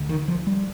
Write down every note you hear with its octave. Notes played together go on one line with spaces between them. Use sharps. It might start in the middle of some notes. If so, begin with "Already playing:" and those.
Already playing: D2 D3
D#3
F3
G3